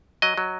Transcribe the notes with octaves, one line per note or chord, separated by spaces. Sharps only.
F#3 D#5
F#3